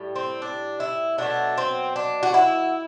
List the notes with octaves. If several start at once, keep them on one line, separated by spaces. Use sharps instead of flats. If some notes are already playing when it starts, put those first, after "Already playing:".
Already playing: A2 G3
C4
D4
E4
B2 F#3 A3 D4
C4
D4
F#4
E4